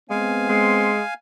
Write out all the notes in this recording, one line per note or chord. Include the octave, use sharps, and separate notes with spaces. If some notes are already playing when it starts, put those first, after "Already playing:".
G#3 B3 C4 F5 G#5
G#3 C6